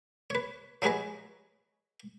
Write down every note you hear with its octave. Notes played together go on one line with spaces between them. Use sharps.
B4 C#5
F3 F#3 F#4 G#4 B4 D#5